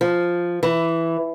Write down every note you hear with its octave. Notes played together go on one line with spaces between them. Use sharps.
F3
E3